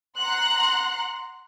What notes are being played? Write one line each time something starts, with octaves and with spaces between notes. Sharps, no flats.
F#5 A#5 C6 F#6